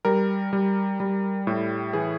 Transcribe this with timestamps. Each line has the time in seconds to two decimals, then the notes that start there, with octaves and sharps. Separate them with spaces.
0.05 G3 A#4
0.53 G3
1.00 G3
1.47 A2
1.93 E3 G#4